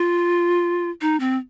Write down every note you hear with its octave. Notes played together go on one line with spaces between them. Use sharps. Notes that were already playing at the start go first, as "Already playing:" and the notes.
Already playing: F4
D#4
C4